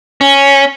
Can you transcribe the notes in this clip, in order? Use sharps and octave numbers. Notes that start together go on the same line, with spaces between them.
C#4